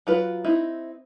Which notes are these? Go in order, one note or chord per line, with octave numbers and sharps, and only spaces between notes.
F#3 F4 B4
C4 D#4 E4